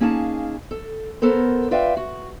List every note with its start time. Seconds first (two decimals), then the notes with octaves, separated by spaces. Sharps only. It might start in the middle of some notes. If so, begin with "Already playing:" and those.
0.01 A#3 C#4 D#4 G#4 F5 A5
0.71 A4
1.22 B3 A4 A#4 C5
1.71 F4 B4 D5 E5 F5 G5
1.97 F#4